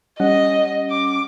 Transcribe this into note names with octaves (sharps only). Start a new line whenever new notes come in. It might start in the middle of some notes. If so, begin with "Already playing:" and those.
G3 C#4 D#5 F#5
D6